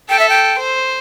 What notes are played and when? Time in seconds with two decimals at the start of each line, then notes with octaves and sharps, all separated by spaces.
0.09 A4 G5
0.19 E5
0.29 G5
0.59 C5